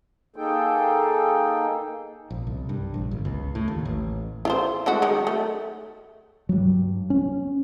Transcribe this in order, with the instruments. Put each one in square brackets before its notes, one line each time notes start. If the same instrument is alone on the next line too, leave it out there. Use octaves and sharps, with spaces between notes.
[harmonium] A#3 D#4 G#4 A4 G5
[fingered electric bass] A#1
C2
G2
A#1
G1
C#2
A2
D#2
A1
[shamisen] E4 F4 C5
G#3 A3 F#4
D#3 F#3 G#3
A3
[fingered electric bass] G2 F#3
C#4